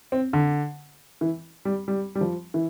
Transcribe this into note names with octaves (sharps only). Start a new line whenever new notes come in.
C4
D3
E3
G3
G3
G3
F3
E3